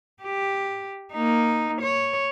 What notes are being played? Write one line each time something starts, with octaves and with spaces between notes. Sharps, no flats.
G4
A#3 D#4
C#5